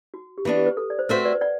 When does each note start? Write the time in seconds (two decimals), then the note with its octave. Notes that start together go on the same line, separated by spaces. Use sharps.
0.14 F#4
0.38 G4
0.45 E3 B3 D4 F#4
0.57 G4
0.66 B4
0.77 A4
0.90 D5
0.99 C5
1.09 A3 C4 F#4 B4 C5 E5
1.25 B4 D5
1.41 D5 F#5